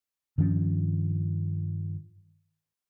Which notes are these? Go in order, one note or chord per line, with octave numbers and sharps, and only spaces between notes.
G2 D#3 F3 C#4